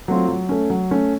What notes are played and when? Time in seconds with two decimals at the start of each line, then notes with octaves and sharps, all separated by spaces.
0.08 F#3 A3 C4 F4
0.28 F#3
0.49 A3 C#4
0.70 F#3
0.91 A3 C#4